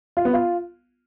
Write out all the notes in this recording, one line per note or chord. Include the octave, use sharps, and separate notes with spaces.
F4
B3
F4